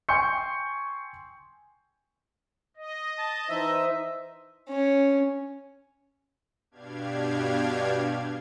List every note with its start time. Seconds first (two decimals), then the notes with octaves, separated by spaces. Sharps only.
0.09 G5 G#5 C6 C#6 G6 C#7
2.77 D#5
3.18 A5
3.49 E3 D#4 C5 E5
4.69 C#4
6.71 G2 B2 D4 G4 F5 G#6